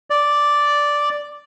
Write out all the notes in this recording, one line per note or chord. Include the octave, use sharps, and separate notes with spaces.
D5